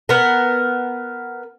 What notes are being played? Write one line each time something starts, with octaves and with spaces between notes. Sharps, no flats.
B3 A#4